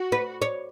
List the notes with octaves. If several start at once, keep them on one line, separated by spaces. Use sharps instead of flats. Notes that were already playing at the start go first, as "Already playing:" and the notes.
Already playing: F#4
B4
C#5